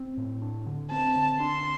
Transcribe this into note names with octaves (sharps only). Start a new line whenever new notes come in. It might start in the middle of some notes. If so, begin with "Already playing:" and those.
Already playing: C4
A2
D4
D3
C4 A5
D3
D4 C6